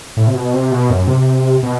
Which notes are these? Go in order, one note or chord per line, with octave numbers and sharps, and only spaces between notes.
A2
C3
B2
C3
B2
F#2
C3
B2